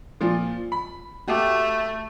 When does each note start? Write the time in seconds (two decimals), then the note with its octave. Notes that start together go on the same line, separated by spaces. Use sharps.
0.21 A#2 F3 F4
0.72 B5
1.28 A3 F#4 G4 D6